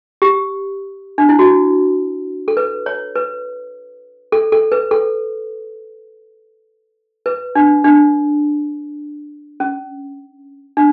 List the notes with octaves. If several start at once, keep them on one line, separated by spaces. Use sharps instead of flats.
G4
D4
E4
F#4
A4
B4
C#5
B4
A4
A4
B4
A4
B4
D4
D4
C#4
D4